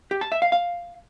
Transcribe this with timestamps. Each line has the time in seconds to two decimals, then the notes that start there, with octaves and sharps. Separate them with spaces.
0.11 G4
0.21 A5
0.32 E5
0.42 F5
0.52 F5